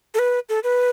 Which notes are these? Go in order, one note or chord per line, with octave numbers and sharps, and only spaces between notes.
A4
B4
A4
B4